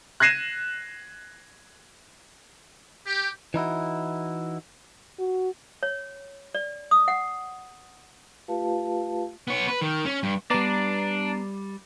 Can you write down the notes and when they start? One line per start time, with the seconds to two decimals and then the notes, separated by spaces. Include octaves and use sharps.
0.20 F#6 G#6 A#6 C7 D#7 E7
3.06 G4
3.54 E3 D#4 E4 F#4
5.19 F#4
5.83 C#5
6.55 D5
6.91 D#6
7.08 F#5
8.48 A3 F4 G4 B4 F5 A5
9.48 B3 C#5
9.68 B4
9.81 D#3
10.05 C#4
10.23 G2
10.50 G3 B3 D4 D5 A#5 C7